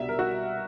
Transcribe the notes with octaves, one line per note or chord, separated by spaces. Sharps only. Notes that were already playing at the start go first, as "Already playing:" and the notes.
Already playing: C2 B2 G3 B3 D4 E5
A#4
F#4